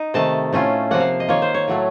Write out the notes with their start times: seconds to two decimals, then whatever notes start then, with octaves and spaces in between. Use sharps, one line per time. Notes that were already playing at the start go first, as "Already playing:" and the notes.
Already playing: D#4
0.14 C3 D#3 A3 A5
0.53 A2 A3 C#4 F4
0.91 C3 F3 A#3 F#5
1.00 F5
1.20 D#5
1.29 D#3 A#3 F4 C#5
1.42 C5
1.54 C#5
1.68 A2 F#3 A3